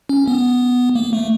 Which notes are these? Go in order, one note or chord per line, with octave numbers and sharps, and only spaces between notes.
C#4
B3
A#3
A3